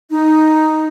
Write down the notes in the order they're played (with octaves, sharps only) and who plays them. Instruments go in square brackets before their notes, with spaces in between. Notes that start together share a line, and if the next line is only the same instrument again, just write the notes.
[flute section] D#4